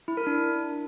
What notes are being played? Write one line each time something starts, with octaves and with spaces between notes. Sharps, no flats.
E4
A#4
D4